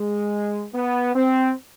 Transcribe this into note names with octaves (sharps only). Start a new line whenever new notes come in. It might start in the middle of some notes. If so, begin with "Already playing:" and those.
Already playing: G#3
B3
C4